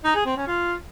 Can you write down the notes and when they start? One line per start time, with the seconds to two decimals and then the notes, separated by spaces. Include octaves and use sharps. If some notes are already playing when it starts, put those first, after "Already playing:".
0.04 D#4
0.15 G#4
0.26 C4
0.37 C#4
0.48 F4